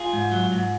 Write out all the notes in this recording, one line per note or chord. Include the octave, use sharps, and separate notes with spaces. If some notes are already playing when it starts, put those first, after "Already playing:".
Already playing: F4 G#4
G#2
F#3
G#2